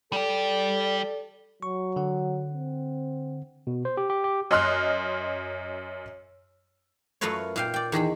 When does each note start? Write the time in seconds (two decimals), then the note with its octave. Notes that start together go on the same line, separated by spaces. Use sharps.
0.13 G3 G4 A4 D5
1.63 F#3 C#6
1.96 D3 F#5
2.53 C4
3.67 B2
3.85 C5
3.97 G4
4.10 G4
4.24 G4
4.51 F#2 D#5 C6 F6 F#6
7.21 F#2 A3 F4 A#4 B4 C#5
7.56 A#2 F5 G5
7.74 D5 G5
7.92 E2 D#3 G#4 B5